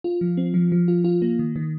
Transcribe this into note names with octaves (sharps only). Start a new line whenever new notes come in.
F4
F3
C4
F3
F3
F4
F4
A#3
D#3
D#3